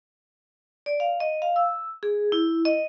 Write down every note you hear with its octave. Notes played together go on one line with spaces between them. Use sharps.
D5
F5
D#5
F5
E6
G#4
E4
D#5